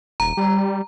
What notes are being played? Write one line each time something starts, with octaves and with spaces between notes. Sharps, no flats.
D#1 A#5
G3